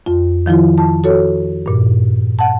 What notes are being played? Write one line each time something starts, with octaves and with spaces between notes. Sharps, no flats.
F2 F4
D#3 F3 E4 F4
A5
F#4 A4 C#5
G2 A#2
F#5 A5